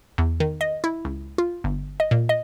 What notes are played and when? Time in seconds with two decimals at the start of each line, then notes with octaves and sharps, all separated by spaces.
0.18 E2
0.40 D#3
0.61 D#5
0.84 E4
1.05 C#2
1.38 F4
1.64 G1
2.00 D#5
2.11 A#2
2.29 D#5